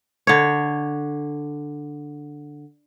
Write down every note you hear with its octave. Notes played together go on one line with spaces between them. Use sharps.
D3 C#5